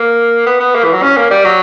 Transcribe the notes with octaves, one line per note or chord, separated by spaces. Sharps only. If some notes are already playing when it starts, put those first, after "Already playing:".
Already playing: A#3
B3
B3
A#3
E3
F#3
C#4
A#3
G3
F#3